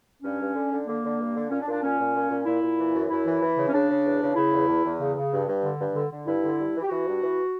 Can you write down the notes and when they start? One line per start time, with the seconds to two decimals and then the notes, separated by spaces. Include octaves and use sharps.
0.23 G2 C#4
0.40 G2
0.55 D3
0.71 D3
0.87 D3 A#3
1.03 D3
1.19 G2
1.35 D3
1.50 A#2 C#4
1.61 D4
1.67 A#2
1.72 D4
1.82 A#2 C#4
1.98 A#2
2.14 A#2
2.29 A#2
2.45 A#2 E4
2.62 A#2
2.77 E3
2.93 F#2
3.09 F#2 E4
3.25 E3
3.41 E3
3.56 C#3
3.68 C#4
3.72 C#3 D4
3.89 C#3
4.04 E2
4.21 C#3
4.36 C#3 E4
4.52 E2
4.68 E2
4.84 E2
5.00 C#3
5.16 C#3
5.31 G2
5.48 G2
5.63 D3
5.79 G2
5.95 D3
6.11 D3
6.26 G2 E4
6.43 D3
6.58 G2
6.75 E3
6.82 G4
6.90 E3 F#4
7.06 G2
7.22 E3